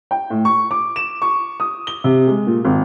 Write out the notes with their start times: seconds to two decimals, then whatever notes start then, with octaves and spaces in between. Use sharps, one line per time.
0.11 G5
0.30 A2
0.45 C#6
0.71 D6
0.96 E7
1.22 C#6
1.60 D#6
1.87 G7
2.04 C3
2.27 G#3
2.47 A#2
2.65 G#1